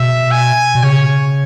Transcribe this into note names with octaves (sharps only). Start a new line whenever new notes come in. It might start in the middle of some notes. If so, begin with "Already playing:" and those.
Already playing: B2 E5
G#5
B2
C#3 C#5